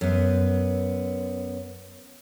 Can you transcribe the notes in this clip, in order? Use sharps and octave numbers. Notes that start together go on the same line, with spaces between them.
F#2 B3